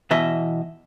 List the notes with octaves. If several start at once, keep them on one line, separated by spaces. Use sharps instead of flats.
B2 E3 D#5 E5